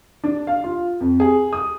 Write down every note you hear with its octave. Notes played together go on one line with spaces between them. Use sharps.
D4
F5
F4
F2
G#4
D#6